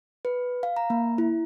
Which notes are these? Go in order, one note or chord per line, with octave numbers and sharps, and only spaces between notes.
B4
F5
A#5
A#3
E4